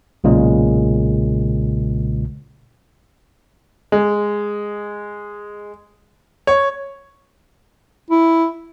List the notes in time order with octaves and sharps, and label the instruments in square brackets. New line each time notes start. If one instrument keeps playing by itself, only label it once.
[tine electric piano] B1 A#2 C#3 G#3
[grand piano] G#3
C#5
[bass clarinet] E4